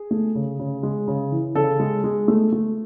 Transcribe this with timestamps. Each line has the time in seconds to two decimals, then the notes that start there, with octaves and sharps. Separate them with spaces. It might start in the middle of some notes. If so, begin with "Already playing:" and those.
Already playing: G#4
0.11 A3
0.35 C#3
0.59 C#3
0.83 G#3
1.08 C#3
1.32 E3
1.55 C#3 A4
1.80 G#3
2.04 G#3
2.28 A3
2.52 A3